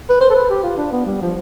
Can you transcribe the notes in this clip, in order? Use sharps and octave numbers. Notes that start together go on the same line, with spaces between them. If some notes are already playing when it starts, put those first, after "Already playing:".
B4
C5
A4
B4
G4
F4
D4
B3
G3
F3